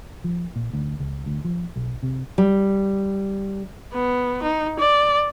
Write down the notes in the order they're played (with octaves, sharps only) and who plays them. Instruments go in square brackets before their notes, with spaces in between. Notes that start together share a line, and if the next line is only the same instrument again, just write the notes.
[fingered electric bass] F3
A#2
D2
C#2
D2
F3
B1
C3
[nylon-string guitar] G3
[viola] B3
D#4
D5